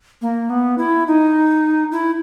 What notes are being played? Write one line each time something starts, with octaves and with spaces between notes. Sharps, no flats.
A#3
B3
E4
D#4
E4